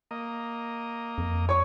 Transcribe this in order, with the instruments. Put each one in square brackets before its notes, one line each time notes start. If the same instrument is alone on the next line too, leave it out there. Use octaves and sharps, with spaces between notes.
[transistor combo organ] A#3 D#5
[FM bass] F2
[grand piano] C#5 C#6